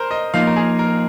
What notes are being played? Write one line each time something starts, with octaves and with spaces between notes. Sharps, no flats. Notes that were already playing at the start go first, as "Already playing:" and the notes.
Already playing: A#4 C5
D#5
F3 A#3 D#4 F5
A#4
G#4
A#4